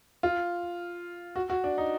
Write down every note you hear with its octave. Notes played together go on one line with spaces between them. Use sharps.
F4
F#4
F#4
D4
D#4